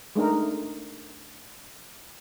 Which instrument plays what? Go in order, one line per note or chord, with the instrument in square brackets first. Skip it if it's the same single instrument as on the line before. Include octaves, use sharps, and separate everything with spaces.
[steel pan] G#3 A3 D4 D#4 A#4